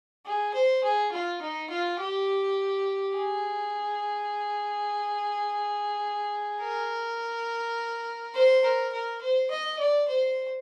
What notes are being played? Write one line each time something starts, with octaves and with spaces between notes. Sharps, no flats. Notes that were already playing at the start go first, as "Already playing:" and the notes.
G#4
C5
G#4
F4
D#4
F4
G4
G#4
A#4
C5
A#4
A#4
C5
D#5
D5
C5